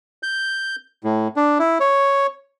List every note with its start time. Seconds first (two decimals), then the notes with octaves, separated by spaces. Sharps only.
0.23 G6
1.04 A2
1.36 D4
1.59 E4
1.80 C#5